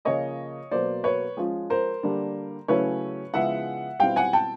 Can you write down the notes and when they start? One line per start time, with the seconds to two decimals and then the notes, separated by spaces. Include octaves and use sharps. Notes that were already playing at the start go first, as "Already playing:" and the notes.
0.05 C#3 F3 A#3 C#5 D#5
0.71 B2 F#3 A#3 C5 D5
1.04 B4 C#5
1.37 F3 G#3 C#4 F4
1.70 A#4 C5
2.03 D3 G3 A#3 D4
2.68 C#3 F#3 A3 C#4 E4 B4 C#5
3.34 C#3 F3 G#3 B3 E4 E5 F#5
4.00 B2 G3 C4 E4 F5 G5
4.16 F#5 G#5
4.33 G5 A5